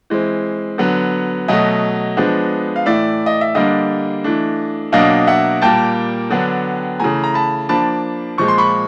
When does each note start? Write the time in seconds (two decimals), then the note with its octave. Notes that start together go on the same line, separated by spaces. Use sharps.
0.10 E3 G#3 C4
0.78 D3 F#3 B3
1.48 B2 F#3 A3 D#5
2.17 F3 G#3 B3 D4
2.76 F5
2.86 A2 E3 A3 D5 E5
3.26 D#5
3.41 E5
3.55 D3 G3 A#3 D4 D#5 F5
4.24 E3 A3 D4
4.92 B2 F#3 A#3 D4 D#5 F5
5.27 E5 F#5
5.62 A#2 G3 A#3 G5 A5
6.30 D3 F#3 B3 D4
7.00 C#3 E3 A3 G#5 A#5
7.24 A#5
7.34 A5 B5
7.69 F3 A#3 D4 A5 B5
8.38 A#2 F3 G#3 C#6
8.48 C6
8.58 B5 C#6